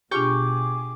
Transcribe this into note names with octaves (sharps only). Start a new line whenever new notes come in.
B2 D4 F4 G4 G#4 G5 C#6 D6